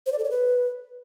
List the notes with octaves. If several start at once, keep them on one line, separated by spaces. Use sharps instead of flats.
C5
D5
A4
C#5
B4